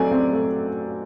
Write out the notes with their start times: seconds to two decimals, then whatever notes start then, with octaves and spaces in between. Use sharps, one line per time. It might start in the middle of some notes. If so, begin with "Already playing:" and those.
Already playing: F#3 A3 C4 D5 G#5
0.11 C4
0.33 A3